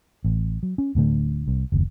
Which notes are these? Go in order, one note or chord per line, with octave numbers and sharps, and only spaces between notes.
A1
F#3
C#4
D1 A2 D3 A3
C2
F#1 D#2